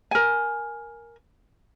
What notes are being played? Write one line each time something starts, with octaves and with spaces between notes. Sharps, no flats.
A#4 G#5